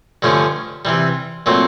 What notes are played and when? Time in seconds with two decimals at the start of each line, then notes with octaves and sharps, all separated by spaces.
0.22 G2 D3 F3 A3 C#4
0.85 C3 E3 G3
1.46 A#2 F#3 A3 C4